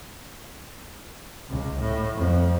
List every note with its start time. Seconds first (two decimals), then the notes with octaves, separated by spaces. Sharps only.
1.50 C#2
1.80 A2
2.15 F2